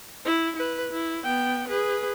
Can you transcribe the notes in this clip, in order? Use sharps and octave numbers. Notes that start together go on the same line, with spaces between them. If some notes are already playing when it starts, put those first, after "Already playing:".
E4
E4 B4
E4
B3 G5
G#4 B4